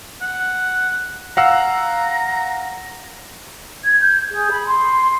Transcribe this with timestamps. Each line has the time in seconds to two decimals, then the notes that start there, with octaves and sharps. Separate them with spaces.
0.22 F#5
1.37 F5 F#5 A#5 E6
3.84 G#6
4.01 G6
4.31 G#4
4.51 B5
4.67 C6